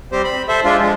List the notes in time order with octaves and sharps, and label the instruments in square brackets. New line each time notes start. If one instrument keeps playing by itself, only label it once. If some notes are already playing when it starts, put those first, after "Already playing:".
[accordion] G3 C4 G4 C5
B5
A4 C5 E5
G#3 D4 F4
F3 G#3